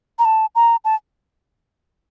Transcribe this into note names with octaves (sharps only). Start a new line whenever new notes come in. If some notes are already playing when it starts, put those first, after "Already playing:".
A#5
A5
A#5
A5